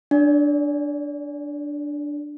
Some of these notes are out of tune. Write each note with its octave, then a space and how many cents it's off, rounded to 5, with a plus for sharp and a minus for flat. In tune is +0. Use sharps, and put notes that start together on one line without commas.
D4 +0 D5 -45